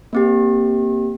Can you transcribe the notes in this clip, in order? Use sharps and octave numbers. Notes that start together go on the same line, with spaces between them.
A#3 C4 G4